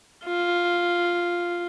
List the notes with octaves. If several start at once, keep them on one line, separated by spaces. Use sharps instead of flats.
F4